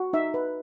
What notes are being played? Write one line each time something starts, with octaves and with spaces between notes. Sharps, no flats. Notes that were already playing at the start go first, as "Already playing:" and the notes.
Already playing: F#4
D#4 E5
B4